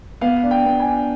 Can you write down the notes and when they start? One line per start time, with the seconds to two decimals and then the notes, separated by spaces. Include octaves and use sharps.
0.21 B3 F5
0.43 D4
0.51 G5
0.65 B3
0.80 G#5
0.86 D4